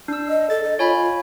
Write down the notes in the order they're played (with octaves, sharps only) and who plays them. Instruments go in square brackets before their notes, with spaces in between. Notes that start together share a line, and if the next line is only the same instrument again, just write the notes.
[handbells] D4 E6
[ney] D#5
[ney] A4 [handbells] A6
[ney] D#5
[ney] F4 [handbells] C#5 G#5 B5